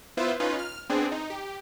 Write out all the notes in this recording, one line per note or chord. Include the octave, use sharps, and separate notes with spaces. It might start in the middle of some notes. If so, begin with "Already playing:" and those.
B3 E4 F4 B4 C5 E5
C#4 D#4 F4 B4
F6
B3 C4 D4 G#4
D#4
G4